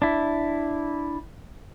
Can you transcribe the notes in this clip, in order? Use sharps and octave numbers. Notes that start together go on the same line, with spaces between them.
D4 E4